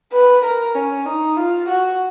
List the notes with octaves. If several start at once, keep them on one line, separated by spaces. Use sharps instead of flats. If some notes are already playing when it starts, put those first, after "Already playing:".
B4
A#4
C#4
D#4
F4
F#4